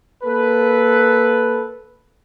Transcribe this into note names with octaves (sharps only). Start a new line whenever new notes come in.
A#3 A4 B4